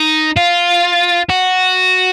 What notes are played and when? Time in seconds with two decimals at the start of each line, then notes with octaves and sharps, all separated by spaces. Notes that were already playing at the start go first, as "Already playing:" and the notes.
Already playing: D#4
0.37 F4
1.30 F#4